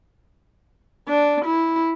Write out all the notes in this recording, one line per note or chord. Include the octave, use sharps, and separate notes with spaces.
D4
E4